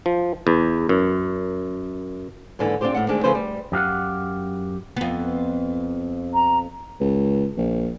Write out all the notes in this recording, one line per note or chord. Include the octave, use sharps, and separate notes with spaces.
F3
E2
F#2
D#2 G#2 D3 E3
C4 D4 F4 G4 C5
A2 A3 F#5
D2 D#3 G#3 C4 D4
C#3 F3 A3 B4 C5
G3
F#2 G4 F5 F#5
F2 B3
A#5
C#2
A#1